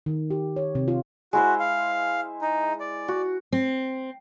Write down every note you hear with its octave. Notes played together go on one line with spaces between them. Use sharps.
D#3
G4
C#5
C3
F4
G#3 E4 F#4 C5
F5
D#4
D5
F#4
C4